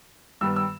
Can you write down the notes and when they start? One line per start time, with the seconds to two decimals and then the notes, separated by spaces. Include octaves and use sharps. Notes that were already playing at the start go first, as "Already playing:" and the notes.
0.41 G2 D#3 G3 B3 E6
0.56 E6